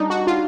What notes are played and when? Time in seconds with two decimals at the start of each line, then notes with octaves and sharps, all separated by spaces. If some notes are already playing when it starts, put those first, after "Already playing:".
Already playing: G3 D4 D#4
0.10 F#4
0.27 F4